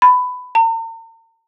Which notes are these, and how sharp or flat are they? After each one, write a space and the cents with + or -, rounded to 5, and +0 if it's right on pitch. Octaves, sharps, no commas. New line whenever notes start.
B5 +15
A#5 -45